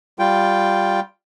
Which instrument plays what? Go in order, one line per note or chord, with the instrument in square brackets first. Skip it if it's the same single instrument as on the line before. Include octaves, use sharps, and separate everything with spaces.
[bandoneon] G3 F4 G5